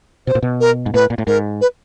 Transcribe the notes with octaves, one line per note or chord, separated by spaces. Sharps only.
B2 C5
A#2
B2
A#4
G#2
A2 B4
A#2
A2
G#2 A#4
B4